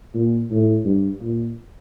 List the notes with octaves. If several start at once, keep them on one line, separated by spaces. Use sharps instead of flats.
A#2
A2
G2
A#2